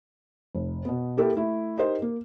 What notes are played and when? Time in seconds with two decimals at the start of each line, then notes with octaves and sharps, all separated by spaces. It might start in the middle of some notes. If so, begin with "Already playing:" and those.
0.55 F1
0.85 B2 B3
1.17 A#3 E4 G4 A4 A#4
1.36 A3 E4
1.78 D#4 G4 A#4 C5
2.02 A#3